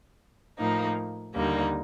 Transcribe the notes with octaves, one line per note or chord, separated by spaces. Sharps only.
A2 F3 A#3 D#4
D#2 D3 G3 A#3 D#4